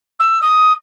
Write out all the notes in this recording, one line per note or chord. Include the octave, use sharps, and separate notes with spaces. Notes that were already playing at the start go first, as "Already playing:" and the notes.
E6
D#6